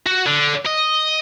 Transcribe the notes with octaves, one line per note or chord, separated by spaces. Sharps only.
F#4
D3
D#5